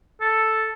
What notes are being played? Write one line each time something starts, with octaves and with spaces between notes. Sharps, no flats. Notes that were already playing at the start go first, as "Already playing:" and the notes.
A4